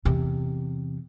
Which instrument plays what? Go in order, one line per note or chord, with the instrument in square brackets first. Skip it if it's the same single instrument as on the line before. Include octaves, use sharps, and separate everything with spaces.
[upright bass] E2 C3